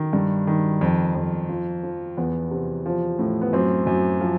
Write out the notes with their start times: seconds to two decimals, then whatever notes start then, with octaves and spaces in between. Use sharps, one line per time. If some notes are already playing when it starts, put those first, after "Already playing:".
Already playing: D#3
0.13 G2
0.47 D#3
0.81 F2
1.15 F2
1.49 F3
1.83 F3
2.17 E2 B3
2.51 C3
2.86 F3
3.19 A2
3.41 B3
3.53 F#2 C4
3.87 F#2
4.21 F3